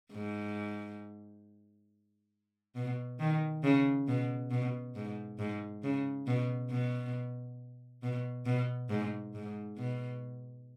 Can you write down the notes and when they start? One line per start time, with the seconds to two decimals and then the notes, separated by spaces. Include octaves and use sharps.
0.12 G#2
2.75 B2
3.20 D#3
3.63 C#3
4.08 B2
4.51 B2
4.95 G#2
5.39 G#2
5.83 C#3
6.27 B2
6.71 B2
8.02 B2
8.46 B2
8.89 G#2
9.34 G#2
9.78 B2